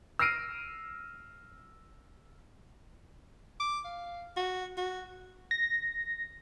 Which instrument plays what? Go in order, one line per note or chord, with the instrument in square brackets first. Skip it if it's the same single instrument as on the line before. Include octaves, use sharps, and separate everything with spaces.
[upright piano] E6 F6 A#6 C7 D7 D#7
[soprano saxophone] D6
F5
F#4
F#4
[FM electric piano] A#6